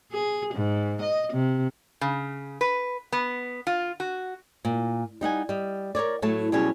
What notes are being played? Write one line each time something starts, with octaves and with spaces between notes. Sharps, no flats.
G#4
G#2
D#5
C3
C#3
B4
B3
F4
F#4
A#2
G3 D#4 F#5 G#5
G3 D#5
A#4 B4 C#5 D5
A2 F#3 A3 A5
B2 F#3 G3 C#4 G#4 C#5